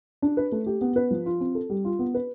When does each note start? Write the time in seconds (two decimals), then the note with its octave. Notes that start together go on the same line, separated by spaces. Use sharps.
0.22 D4
0.37 B4
0.52 A3
0.66 G4
0.81 B3
0.96 B4
1.11 F3
1.26 F4
1.40 C4
1.55 A4
1.70 G3
1.85 F4
1.99 B3
2.14 B4